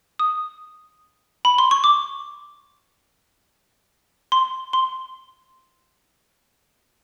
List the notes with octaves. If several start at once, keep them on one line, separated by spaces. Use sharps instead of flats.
D#6
B5
C6
C#6
D6
C6
C6